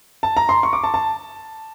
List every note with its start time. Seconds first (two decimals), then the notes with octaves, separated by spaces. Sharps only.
0.23 A5
0.37 A#5
0.49 C6
0.63 C#6
0.73 D6
0.84 A5
0.94 A5